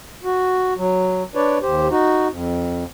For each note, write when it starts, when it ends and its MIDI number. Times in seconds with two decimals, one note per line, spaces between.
0.24 0.74 66
0.78 1.23 54
1.35 1.58 62
1.35 1.58 71
1.35 1.58 73
1.35 1.58 74
1.62 1.88 39
1.62 1.88 67
1.62 1.88 72
1.91 2.28 63
1.91 2.28 66
2.30 2.84 41